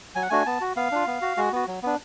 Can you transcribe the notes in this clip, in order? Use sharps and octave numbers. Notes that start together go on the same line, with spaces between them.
F#3 G#5
F#5
A3 D4 F#4 G#5
B3 A5
F#4
B3 F5
D4 F4
B3
F#4
G#3 F#4
B3 F#4
F#3
B3 D4